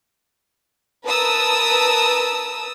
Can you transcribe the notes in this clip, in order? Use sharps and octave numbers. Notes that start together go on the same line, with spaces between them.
A#4 B4 A5 D#6 E6